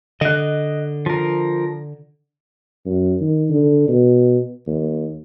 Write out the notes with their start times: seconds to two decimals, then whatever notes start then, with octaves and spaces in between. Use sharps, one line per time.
0.21 D3 D#5 F#6
1.06 F3 A#4
2.86 F#2
3.21 D#3
3.50 D3
3.88 B2
4.67 D#2